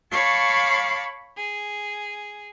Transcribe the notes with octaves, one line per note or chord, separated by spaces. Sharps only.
C#5 F5 A5 B5 C#6 D6
G#4